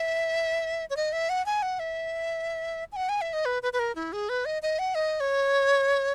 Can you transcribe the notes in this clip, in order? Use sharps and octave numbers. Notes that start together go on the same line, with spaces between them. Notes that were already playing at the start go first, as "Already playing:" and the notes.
Already playing: E5
C#5
D#5
E5
F#5
G#5
F#5
E5
G#5
F#5
G#5
E5
D#5
B4
B4
B4
A#4
E4
G#4
B4
D#5
D#5
F#5
D#5
C#5